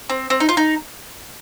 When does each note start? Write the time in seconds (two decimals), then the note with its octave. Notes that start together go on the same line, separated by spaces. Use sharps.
0.10 C4
0.30 C4
0.40 D#4
0.49 F4
0.57 D#4